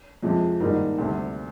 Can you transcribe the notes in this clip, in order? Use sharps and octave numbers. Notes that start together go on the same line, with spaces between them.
F2 C3 F3 G#3
G#2 D#3 G3 A#3 D#4
D2 C3 G3